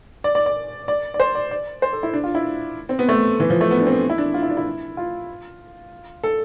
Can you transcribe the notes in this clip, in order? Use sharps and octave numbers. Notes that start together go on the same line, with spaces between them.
D5
D5
D5
D5
D5
C5
D5
D5
C5
A4
E4
D4
F4
E4
C4
B3
A3
E3
F3
A3
B3
D4
C4
E4
D4
F4
E4
D4
E4
F4
A4